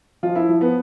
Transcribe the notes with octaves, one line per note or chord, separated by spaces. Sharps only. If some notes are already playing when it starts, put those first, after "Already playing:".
F3 F4
E4
F3
B3